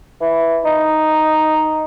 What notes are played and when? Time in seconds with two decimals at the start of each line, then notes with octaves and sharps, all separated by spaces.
0.21 E3
0.65 D#4